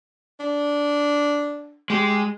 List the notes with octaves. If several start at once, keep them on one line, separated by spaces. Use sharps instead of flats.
D4
G#3 G4